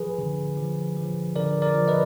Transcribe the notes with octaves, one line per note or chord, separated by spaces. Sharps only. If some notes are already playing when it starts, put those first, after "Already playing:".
Already playing: F3 G#4 B4
D3
F3
F3
D3 A#4 D5
A#4 D5
F3
B4 D#5